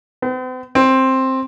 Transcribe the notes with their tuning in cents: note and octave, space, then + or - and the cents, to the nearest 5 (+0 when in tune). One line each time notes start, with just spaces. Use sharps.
C4 -45
C4 +10